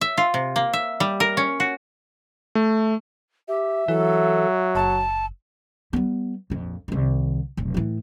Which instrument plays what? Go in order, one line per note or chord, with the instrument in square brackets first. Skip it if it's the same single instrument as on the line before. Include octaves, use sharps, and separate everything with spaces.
[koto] E5
F4
C3
A#3
E5
G3
A#4
C#4
F#4
[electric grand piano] A3
[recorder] G4 [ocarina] E5
[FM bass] E3 [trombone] F#3 [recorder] A4
[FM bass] F#1 [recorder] A5
[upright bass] G3 B3
A#1 F2
C2 D#3
F1 B1
A2 E3